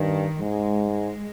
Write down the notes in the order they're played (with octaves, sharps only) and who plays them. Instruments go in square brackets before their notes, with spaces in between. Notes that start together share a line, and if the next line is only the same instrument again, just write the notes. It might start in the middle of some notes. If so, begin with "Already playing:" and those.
Already playing: [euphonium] G2 [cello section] D#3
[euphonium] G#2 [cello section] G#3
[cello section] G#3